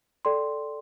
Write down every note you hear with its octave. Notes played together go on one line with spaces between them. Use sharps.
A4 D5 G5 C6